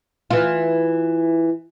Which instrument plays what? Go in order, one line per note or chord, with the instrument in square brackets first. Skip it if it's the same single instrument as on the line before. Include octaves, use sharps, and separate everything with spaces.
[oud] E3 F4